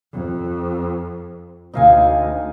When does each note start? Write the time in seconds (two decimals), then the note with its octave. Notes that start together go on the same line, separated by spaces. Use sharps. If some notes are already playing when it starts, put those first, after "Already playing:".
0.13 F2
1.74 D2 D#4 F5 G#5